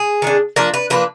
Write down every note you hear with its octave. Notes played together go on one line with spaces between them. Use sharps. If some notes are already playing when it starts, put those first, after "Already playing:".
Already playing: G#4
D#3 G#3 D4
F3 A#3 D4 A#4
B4
F3 A#3 D4 B4